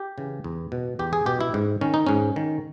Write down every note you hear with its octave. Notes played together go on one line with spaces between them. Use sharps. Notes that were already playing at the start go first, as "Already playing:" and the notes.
Already playing: G4
C#3 E3
E2
B2
E2 G4
G#4
B2 G4
E4
G#2
D#3 C#4
D#4
G#2 C#4
D#3